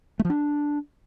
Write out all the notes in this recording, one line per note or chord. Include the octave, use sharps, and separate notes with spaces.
A3
F3
D4